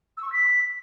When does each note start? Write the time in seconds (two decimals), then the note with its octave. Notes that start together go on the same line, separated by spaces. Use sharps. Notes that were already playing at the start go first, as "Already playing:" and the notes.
0.17 E6
0.22 C#6
0.27 E6
0.33 B6